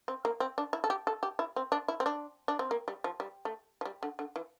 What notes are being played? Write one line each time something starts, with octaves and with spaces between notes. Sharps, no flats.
C4
A#3
C4
D4
E4
A4
G4
A4
G4
E4
C4
D4
E4
C4
D4
D4
C4
A#3
G3
F3
G3
A3
F3
G3
D3
D3
E3